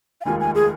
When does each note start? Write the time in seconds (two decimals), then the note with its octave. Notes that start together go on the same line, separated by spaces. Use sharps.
0.21 F5
0.25 F1 D#2 D#3 G#3 F4 G#5
0.40 G#5
0.55 G#4